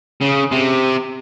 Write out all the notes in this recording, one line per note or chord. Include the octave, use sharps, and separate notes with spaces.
C#3
C3